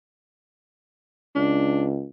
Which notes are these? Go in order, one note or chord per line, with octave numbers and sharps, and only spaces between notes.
C#2 D4